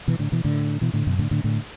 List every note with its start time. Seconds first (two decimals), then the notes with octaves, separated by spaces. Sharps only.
0.08 B2 E3
0.19 A2 D3
0.32 B2 E3
0.45 A2 D3
0.81 B2 E3
0.94 A2 D3
1.07 F#2 B2
1.19 A2 D3
1.31 A2 D3
1.44 A2 D3